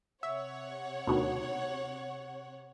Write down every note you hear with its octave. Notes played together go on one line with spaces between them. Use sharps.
C3 C#5 E5 F#5
D2 B2 D#3